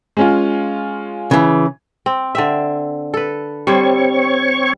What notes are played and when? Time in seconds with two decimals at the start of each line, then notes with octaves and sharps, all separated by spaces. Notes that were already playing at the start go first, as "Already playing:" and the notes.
0.17 G#3 C#4 F4
1.31 C#3 E3
2.06 C4
2.35 D3 C4 E5
3.14 A4 B4
3.67 G3 C4 C5 C#5 C#6